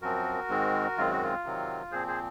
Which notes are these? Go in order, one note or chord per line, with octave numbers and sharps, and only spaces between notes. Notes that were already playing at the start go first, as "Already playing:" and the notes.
F#2 F3 C4 F#4 A#4
G#2 D#3 G#3 C4
F#2 D#3 G#3 C4 F4
F#4
F4
C3 D#3 F#3 C4
A#2 F3 C4 G#4 C5
G#4 C5